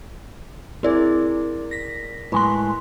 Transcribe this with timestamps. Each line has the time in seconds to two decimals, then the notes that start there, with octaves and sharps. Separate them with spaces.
0.83 C4 E4 G#4 A#4 D5
1.71 A#6 B6
2.32 A2 G#3 B4 C6 F#6